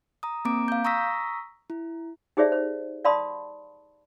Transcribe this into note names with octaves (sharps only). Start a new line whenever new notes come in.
A#5 D#6
A#3 C4 A#5 D6 D7
F5 G6
A#5 C#6 D#6 E6 A#6 B6
E4
D#4 G4 G#4 C5 D5 E5
C5
D5 F5 A5 B5 C6 D#6